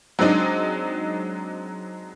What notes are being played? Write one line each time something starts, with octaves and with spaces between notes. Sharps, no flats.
F#3 G#3 C4 D4 D#4